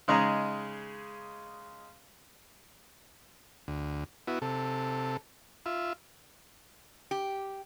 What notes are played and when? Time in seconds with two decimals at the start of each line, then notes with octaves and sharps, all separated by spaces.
0.08 C#3 G#3 D#4 A#5
3.68 D2
4.27 B3 E4 F#4
4.42 C3 A4
5.66 F4 E5
7.11 G4